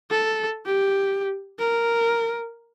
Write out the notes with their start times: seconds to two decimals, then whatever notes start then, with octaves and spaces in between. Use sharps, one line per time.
0.11 A4
0.66 G4
1.59 A#4